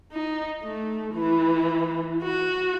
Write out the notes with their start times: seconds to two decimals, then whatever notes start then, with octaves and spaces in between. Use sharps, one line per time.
0.12 D#4
0.63 A3
1.14 E3
2.23 F#4